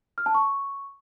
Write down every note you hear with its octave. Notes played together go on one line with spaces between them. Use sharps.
F6
A5
C#6